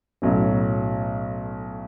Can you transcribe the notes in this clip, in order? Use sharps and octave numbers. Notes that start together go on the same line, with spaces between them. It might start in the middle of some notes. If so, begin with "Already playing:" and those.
B1 A2 F#3 C#4